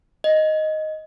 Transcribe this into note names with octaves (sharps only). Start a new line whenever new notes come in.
D#5